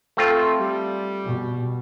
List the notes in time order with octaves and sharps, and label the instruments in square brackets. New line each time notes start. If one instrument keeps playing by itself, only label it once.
[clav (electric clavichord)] A3 C4 F4 [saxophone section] A4
[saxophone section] G3
[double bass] B2